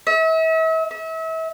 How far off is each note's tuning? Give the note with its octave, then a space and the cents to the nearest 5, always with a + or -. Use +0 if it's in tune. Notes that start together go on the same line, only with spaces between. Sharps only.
E5 -40
E5 -35